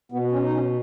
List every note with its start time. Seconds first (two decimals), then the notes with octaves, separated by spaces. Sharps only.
0.12 B2 B3
0.32 C#4
0.43 D#4
0.53 C#4